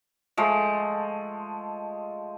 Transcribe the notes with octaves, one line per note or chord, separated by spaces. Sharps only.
F3 G#3 A3